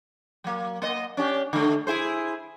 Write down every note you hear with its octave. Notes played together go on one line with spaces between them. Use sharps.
F#3 A#3
A#3 D#5
C#4 D4 G4
D3 A3
E4 G#4 C5